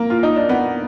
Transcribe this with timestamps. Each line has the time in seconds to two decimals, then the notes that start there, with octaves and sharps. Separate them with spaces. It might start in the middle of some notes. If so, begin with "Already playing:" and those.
Already playing: A#3
0.10 F4
0.23 D#4
0.36 D4
0.49 B3